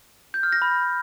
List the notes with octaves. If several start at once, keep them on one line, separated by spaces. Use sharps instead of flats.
G6
F6
A#6
B5